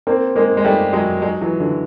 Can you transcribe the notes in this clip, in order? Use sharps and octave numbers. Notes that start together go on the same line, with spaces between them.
A#3 C4
G#3 A#3
G#3
G3 A3
F#3 G#3
F#3 G#3
E3 F#3
D3 E3